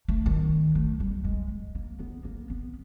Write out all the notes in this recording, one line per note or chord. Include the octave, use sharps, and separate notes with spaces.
A3
D#3
A3
G3
G#3
A#3
B3
A#3
B3